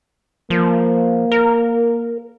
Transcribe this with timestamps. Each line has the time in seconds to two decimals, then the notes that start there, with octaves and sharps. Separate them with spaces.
0.50 F3 A#3
1.32 A#4